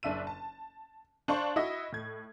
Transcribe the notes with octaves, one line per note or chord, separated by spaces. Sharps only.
F#1 D4 E5 E6 D#7
A5
D4 C5 F5 A5 C6 C#6
E4 F#4 D#5
A2 G#6